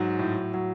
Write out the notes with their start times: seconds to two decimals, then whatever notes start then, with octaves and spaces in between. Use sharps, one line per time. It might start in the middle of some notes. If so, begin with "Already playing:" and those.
Already playing: G#2 F#3
0.19 A2
0.54 F#3